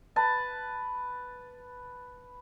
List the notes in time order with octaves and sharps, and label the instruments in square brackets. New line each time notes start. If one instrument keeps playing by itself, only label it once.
[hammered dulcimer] B4 A5